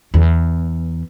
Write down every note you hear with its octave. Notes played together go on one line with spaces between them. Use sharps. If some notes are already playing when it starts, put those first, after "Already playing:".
E2